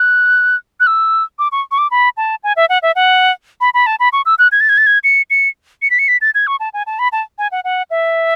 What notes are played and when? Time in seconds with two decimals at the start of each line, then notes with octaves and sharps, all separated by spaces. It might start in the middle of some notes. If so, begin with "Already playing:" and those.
Already playing: F#6
0.80 F#6
0.87 E6
1.39 D6
1.52 C#6
1.71 C#6
1.78 D6
1.91 B5
2.17 A5
2.44 G#5
2.56 E5
2.69 F#5
2.82 E5
2.96 F#5
3.61 B5
3.74 B5
3.87 A5
4.00 B5
4.13 C#6
4.26 E6
4.39 F#6
4.52 G#6
4.61 A6
4.69 G#6
4.78 A6
4.87 G#6
5.04 C#7
5.30 C#7
5.82 C#7
5.90 B6
5.99 C#7
6.08 B6
6.21 A6
6.35 G#6
6.47 C#6
6.60 A5
6.74 G#5
6.87 A5
6.99 B5
7.12 A5
7.38 G#5
7.52 F#5
7.64 F#5
7.90 E5